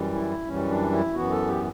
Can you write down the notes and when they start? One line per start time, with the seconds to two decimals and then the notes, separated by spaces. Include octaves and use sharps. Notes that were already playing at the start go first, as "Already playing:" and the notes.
Already playing: F#2 E3 G3
0.14 E4
0.46 F#2 E3 G3 C#4
0.69 D4
0.92 E4
1.14 F#2 E3 B3 F#4
1.31 A4
1.48 G4